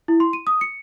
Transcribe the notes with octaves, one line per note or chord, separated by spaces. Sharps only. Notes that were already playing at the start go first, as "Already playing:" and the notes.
E4
C6
D#7
D#6
C#7